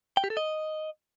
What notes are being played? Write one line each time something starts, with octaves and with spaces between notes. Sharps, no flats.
G5
G4
A4
D#5